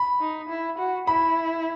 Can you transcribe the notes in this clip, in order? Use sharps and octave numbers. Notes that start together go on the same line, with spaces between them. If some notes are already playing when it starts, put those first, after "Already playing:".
Already playing: B5
D#4
E4
F#4
E4 B5